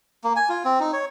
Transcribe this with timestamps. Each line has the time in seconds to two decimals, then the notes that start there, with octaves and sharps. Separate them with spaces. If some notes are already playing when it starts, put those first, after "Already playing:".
0.24 A#3
0.36 G#5
0.49 F4
0.65 C4
0.80 D#4
0.93 C#5